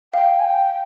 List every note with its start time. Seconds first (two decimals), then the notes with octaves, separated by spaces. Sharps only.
0.13 F5 G5
0.39 G#5
0.44 G5